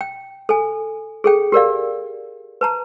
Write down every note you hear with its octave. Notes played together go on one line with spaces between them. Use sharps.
G5
A4 G#5
G#4 A4 G5
G4 A#4 D5 F5
B4 A5 A#5